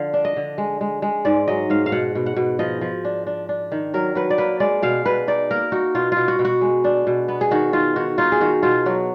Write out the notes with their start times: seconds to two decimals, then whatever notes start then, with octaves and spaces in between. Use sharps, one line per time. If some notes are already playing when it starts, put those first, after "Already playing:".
Already playing: D3 F3 F5
0.14 D4
0.25 D#5
0.36 D3
0.58 G#3
0.81 G#3
1.02 G#3
1.25 G#2 D5
1.48 F#3 D#5
1.70 G#2 F5
1.86 F5
1.92 B2 F#5
2.15 B2
2.26 F#5
2.36 B2
2.59 F3 D#5
2.81 F3
3.05 D4
3.27 D4
3.49 D4
3.72 D#3
3.94 F#3 A#4
4.15 F#3 B4
4.30 D5
4.38 A#3 B4
4.60 G#3 D5
4.82 B2 F5
5.06 B2 B4
5.28 D#4 D5
5.51 A#3 A#4
5.72 D#4 F#4
5.95 B2 F4
6.12 B2 F4
6.28 F#4
6.39 B2
6.45 F#4
6.61 G#3
6.84 D4
7.07 B2
7.28 B3
7.41 G#4
7.51 D#3 F#4
7.73 D#3 F4
7.96 D#3 F#4
8.18 D#4 F4
8.32 G#4
8.41 D#3 F#4
8.63 B2 F4
8.86 F#3 F#4